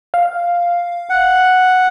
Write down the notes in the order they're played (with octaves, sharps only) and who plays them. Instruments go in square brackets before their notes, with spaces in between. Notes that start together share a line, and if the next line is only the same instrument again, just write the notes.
[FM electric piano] F5
[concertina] F#5